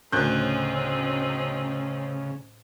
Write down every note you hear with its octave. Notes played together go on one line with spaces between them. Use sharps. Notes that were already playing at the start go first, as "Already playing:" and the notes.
D2 A2 C#3 C4 C#4 D#4 F#6 G6